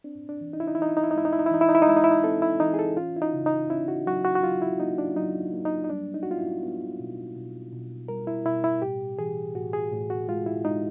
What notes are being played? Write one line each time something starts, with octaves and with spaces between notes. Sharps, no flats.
C4 D4
D4
E3
D#4
E4
D#4
E4
E3 D#4
E4
D#4
E4
D#4
G#3 E4
D#4
E4
D#4
E4
E3 D#4
E4
D#4
E4
D#4
G#3 E4
D#4
E4
D#4
C4 A4
E4
E3 D#4
G#4
A4
C#4 F4
E4
D#4
C#3
D#4
C#4 E4
F#4
F#3 F#4
F#4
F#4
F#3 F4
E4
A#3 D#4
D4
F#3 D#4
A#3
D#4
D#4
G3 D4
D#4
F#4
B3 F4
E4
B3
B2
B2
B2
G3 A#4
E4
B2 E4
E4
A2 G4
E3 G#4
A2 F#4
G#4
A2
F#4
G#3 F4
E4
G#3 D#4